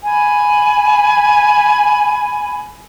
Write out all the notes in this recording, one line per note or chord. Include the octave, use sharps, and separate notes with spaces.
G#5 B5